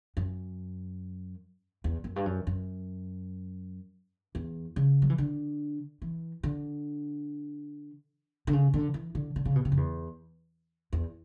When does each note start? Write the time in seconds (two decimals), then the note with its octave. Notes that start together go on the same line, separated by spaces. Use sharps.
0.17 F#2
1.84 E2
2.04 F#2
2.16 G2
2.26 F#2
2.47 F#2
4.35 E2
4.76 C#3
5.02 F#3
5.10 E3
5.18 D3
6.02 E3
6.43 D3
8.47 D3
8.53 C#3
8.74 D3
8.94 E3
9.15 D3
9.36 D3
9.45 C#3
9.56 B2
9.65 C#3
9.72 F#2
9.77 E2
10.93 E2